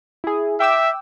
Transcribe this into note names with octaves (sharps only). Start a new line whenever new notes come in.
E4 G#4
E5 G5 D6 E6